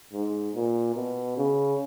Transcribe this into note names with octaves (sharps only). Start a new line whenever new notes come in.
G#2
A#2
B2
C#3